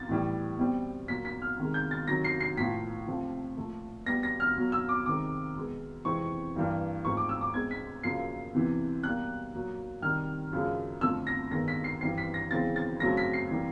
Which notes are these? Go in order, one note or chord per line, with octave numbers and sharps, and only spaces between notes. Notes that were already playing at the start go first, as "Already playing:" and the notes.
Already playing: A6
A2 E3 G3
B2 G3 C4
A#2 F#3 A#3 B6
B6
F6
C3 D#3 G#3
G6
A6
C3 D#3 F#3 A#6
C7
C7
A2 F3 A#3 B6
C3 F3 A3 C4
A#2 F3 A3
B2 G3 B3 A#6
A#6
F6
B2 F#3 A#3
E6
D6
C3 D#3 G#3 C4 D6
B2 G#3 B3
F2 C3 E3 G#3 C4 C#6
G2 E3 G3 A#3
G#2 F3 A3 C4 C#6
D6
E6
D6
B2 G#3 C4 G#6
B6
F#2 C#3 F3 A#3 C7
E2 C3 E3
B2 G3 A#3 F#6
A#2 F#3 A#3
C3 D#3 G3 F6
F#2 C#3 F3 G#3
F2 D3 F3 A3 E6
A#6
G2 D#3 G#3 B3 A#6
B6
C7
G2 E3 G3 C4 C7
B6
A#6
E2 C#3 E3 G#3 C4 A6
A6
F#2 C#3 F#3 A3 C4 A#6
B6
C7
C3 E3 G3 A#3